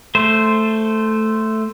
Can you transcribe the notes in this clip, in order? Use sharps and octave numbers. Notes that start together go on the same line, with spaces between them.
A3 C5